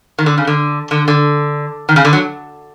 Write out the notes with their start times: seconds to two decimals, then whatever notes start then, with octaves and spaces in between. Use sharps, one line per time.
0.19 D#3
0.26 D3
0.38 C#3
0.47 D3
0.91 D3
1.08 D3
1.89 D#3
1.96 C#3
2.05 D3
2.13 F#3